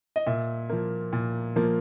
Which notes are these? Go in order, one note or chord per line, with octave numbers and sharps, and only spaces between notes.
D#5
A#2 E5
F3 A#3
A#2
F3 A#3